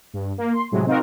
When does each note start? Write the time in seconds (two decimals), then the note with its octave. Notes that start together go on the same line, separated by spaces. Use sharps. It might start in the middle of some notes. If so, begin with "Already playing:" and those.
0.14 G2
0.38 A#3
0.53 C6
0.72 A2 C3 F#3 G#3
0.86 C4 D#4 F4 F#4 A#4